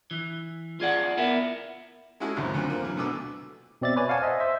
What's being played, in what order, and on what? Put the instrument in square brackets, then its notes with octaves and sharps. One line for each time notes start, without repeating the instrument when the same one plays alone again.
[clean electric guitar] E3
F4 G#4 D5 F#5
B3 E4 A#4
[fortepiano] G#3 C#4 E4 F#4 G#4 A4
G#1 C#2 F#2 A#2 C4
D2 G2 F3 F#3 C4
A#3 C4
E3 F#3
D2 B2 D3 D6 E6
[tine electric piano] B2 C4 D5 E5 A6
B4 C#5 D5 G#5
D5 F5 F#5 G#5 A5
C5 D#5 E5
C5 E5